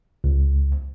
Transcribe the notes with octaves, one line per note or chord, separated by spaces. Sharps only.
C#2